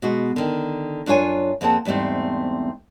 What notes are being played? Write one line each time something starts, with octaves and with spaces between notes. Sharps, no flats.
B2 G#3 F#4
D3 D#3
F#2 D4 F4 C#5 G#5
F2 A#3 C4 G#4 F#5 A5
E2 G#2 G3 A3 C4